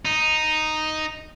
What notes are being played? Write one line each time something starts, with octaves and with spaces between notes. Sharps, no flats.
D#4